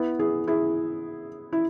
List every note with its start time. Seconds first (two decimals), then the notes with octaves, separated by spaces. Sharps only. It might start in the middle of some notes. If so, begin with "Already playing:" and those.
Already playing: B3 E4
0.19 E4 G#4
0.48 E4 G#4
1.53 E4